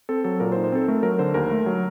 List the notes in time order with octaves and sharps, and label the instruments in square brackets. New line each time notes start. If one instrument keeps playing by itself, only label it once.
[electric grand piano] C4 A4
F#3 A4
A#2 A#4
C5
D#4
C5
C4 A4
A3 A#4
F#3 A#4
D3 C5
D#2 A#4
A3
F#3